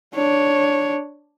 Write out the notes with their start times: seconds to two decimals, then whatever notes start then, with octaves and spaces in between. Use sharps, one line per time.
0.15 D4 C#5